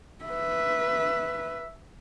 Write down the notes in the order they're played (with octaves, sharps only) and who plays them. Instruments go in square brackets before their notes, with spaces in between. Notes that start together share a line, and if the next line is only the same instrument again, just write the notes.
[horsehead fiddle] B4 E5